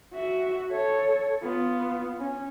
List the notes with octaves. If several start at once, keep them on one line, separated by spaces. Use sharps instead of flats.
F#4 E5
A4 C#5
B3 F4
C#4